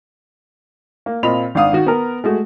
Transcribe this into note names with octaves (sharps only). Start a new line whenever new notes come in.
A#3
A#2 C4 F4 D#5 B5 F7
G#1 D4 F5 D#6
D#3 F#4
B3 A#4
G#3 A3 F#4